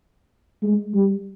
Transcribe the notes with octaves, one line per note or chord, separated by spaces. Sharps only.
G#3
G3